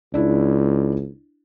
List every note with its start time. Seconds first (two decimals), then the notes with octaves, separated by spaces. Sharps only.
0.14 C#2 D4 E4